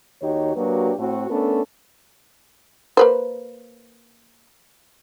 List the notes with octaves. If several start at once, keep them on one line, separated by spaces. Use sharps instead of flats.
D#2 D#3 D#4 F#4 G4 C#5
F#3 A#3 D4 F#4 G4 B4
A2 A3 C4 F#4
A3 B3 C#4 D4 A4 A#4
A#3 B4 C5